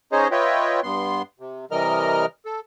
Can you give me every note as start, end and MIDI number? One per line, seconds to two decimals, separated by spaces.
0.12 0.28 61
0.12 0.28 63
0.12 0.28 68
0.12 0.28 72
0.12 0.28 73
0.12 0.28 75
0.31 0.80 65
0.31 0.80 71
0.31 0.80 73
0.31 0.80 75
0.31 0.80 76
0.31 0.80 79
0.83 1.22 43
0.83 1.22 59
0.83 1.22 84
1.40 1.65 48
1.71 2.26 48
1.71 2.26 52
1.71 2.26 55
1.71 2.26 70
1.71 2.26 75
1.71 2.26 89
2.46 2.60 69